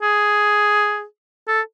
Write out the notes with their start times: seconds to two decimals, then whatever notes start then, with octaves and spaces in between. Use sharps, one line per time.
0.02 G#4
1.48 A4